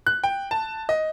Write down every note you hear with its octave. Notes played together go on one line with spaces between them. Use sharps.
F#6
G5
A5
D#5